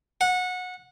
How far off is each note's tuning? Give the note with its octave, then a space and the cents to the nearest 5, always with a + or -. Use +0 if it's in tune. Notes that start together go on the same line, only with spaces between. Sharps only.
F#5 -20